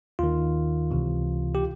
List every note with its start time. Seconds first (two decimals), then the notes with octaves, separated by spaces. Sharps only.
0.19 D#2 D#3 F4
0.91 C#2 C3 E3
1.55 G4